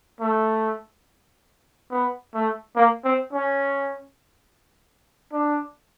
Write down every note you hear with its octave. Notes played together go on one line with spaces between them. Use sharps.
A3
B3
A3
A#3
C4
C#4
D4